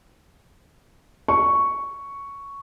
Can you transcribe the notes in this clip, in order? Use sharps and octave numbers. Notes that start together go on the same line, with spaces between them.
C#6